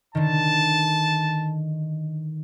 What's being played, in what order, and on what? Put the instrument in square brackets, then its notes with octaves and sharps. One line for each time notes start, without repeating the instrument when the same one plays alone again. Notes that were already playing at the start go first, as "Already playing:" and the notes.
[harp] D3 D#3 [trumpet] A5